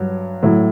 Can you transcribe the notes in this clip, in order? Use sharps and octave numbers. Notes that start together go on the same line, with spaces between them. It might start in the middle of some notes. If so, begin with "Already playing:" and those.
Already playing: G2 F#3
A2 F#3